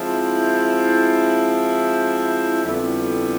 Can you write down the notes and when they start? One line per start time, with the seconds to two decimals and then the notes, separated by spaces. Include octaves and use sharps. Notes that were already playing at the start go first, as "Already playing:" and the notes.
Already playing: F3 G#3 C4 E4
2.63 F2 D3 G3 B3 E4